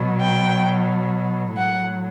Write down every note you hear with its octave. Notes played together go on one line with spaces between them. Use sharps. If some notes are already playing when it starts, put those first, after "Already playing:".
Already playing: B2 F#3
G5
A2 F#3 F#5